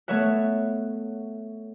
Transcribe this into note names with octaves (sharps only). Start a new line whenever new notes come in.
A3 B3 C#5 E5 F#5